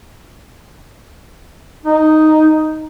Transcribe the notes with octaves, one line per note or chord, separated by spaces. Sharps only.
D#4